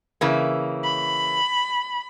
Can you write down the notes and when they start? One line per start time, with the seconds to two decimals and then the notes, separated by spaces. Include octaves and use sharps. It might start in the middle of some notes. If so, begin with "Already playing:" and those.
0.21 C#3 E3 A#3
0.84 B5